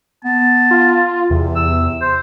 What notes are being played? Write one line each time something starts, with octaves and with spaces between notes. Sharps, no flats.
B3 A5
F4
E2 C3
E6
C5